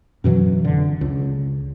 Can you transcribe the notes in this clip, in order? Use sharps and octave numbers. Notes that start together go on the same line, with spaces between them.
F#2 B2 E3 F#3
F1 D3
C#2